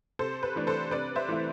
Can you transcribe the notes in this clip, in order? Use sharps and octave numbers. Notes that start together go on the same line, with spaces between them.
C3 A4 C5
B4
E3 A3 D4
A4 C5
C3 B4 D5
C5 E5
E3 A3 E4